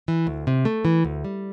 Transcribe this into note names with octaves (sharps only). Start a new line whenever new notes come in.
E3
D2
C3
A3
E3
D2
G3